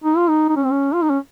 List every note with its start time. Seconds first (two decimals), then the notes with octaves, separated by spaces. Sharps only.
0.04 D#4
0.17 F4
0.29 D#4
0.49 D#4
0.56 C#4
0.63 C4
0.71 C#4
0.94 F4
1.02 D#4
1.10 C#4